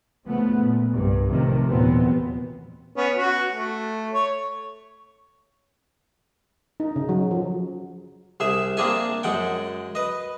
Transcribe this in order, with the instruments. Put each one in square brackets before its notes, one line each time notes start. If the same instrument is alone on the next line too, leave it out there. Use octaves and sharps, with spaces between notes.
[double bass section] C#3 F3 A3 B3
A#2
C2 G2
A2 C3 D#3 F3 A3
D#2 A#2 E3 F#3 B3 C4
[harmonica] B3 C#4
F#4
A3
C#5
[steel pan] D#4
C#3
F#3
F3
[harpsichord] C2 G#4 E5
A#3 C4 D4 G#4 E5 G#5
F#2 G#3 F#5 G5
B4 D#5